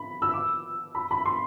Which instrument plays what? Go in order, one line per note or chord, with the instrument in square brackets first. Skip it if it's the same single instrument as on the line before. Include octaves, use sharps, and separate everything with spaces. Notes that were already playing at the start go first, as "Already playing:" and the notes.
Already playing: [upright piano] B5
E6
D6
B5
B5
C6